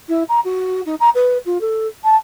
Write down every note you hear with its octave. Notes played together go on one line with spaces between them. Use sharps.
E4
A#5
F#4
D#4
A#5
B4
F4
A4
A5